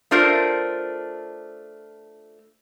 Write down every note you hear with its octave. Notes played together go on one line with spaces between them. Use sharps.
A3 D4 F4 A#4 C5